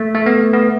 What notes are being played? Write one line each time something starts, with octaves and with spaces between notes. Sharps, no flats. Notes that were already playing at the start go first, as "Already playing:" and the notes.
Already playing: A3
A3
B3
B3